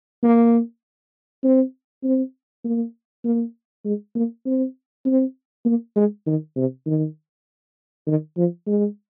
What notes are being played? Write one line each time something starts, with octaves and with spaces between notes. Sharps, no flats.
A#3
C4
C4
A#3
A#3
G#3
A#3
C4
C4
A#3
G#3
D#3
C3
D#3
D#3
F3
G#3